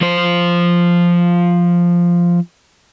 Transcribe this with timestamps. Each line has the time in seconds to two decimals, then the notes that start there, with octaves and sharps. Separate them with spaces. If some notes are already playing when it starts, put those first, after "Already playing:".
0.01 F3 C5